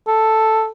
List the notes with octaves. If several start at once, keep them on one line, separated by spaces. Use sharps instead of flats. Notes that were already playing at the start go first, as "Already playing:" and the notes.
A4